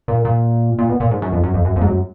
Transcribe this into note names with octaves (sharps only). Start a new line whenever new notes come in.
A#2
A#2
A#2
B2
A#2
G#2
F#2
F2
F#2
F2
F#2
F2
G#2
F#2